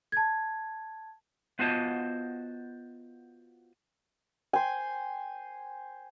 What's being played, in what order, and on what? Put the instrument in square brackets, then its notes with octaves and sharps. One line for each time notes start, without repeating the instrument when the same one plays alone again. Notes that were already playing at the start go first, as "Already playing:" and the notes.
[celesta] A5 G#6
[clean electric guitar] B3 F4 F#4 C5 D#5 A5
[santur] C5 G5 G#5